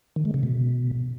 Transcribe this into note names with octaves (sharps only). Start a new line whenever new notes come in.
D#3
G#3
C#3
B2